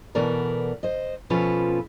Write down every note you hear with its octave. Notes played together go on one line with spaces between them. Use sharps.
B2 E3 B3 A4 A#4 D5
C5 D#5
B2 F3 C#4 F4 A4 B4